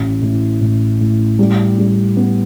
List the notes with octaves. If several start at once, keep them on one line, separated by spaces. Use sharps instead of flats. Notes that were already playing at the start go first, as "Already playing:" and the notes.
Already playing: A1
A2
A2
A2
G3
G3
B3